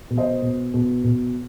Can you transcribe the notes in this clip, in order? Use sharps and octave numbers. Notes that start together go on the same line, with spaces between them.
B2
C5 D#5
B2
B2
B2